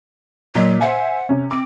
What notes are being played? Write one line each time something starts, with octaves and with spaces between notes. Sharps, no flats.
A#2 F#3 D#5 B6
C5 E5 F#5 G#5
C3 C#4
C4 D6 D7